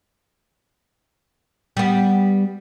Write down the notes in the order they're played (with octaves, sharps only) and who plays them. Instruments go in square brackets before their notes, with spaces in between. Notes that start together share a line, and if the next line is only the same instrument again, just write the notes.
[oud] G3 B3